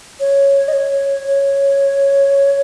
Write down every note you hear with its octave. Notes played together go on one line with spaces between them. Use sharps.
C#5
D#5
C#5
C#5